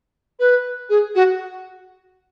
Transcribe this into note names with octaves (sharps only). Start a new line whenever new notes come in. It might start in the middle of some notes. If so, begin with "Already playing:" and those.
B4
G#4
F#4